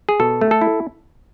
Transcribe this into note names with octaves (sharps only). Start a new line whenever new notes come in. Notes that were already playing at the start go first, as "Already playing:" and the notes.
G#4
B2 A4
A3
A4
E4